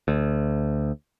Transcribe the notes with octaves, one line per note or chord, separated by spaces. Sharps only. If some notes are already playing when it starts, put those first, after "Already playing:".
D2